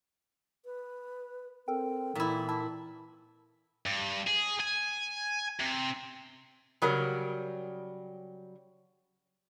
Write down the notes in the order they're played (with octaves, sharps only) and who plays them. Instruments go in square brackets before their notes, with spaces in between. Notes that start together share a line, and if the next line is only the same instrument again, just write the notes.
[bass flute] B4
[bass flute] C4 [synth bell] A4 A#4 G5
[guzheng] A#2 E4 [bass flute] E3
[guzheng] E4 [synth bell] A5
[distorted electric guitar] G2
G#4
G#5
C3
[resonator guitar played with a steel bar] C#3 F#3 G3 A#4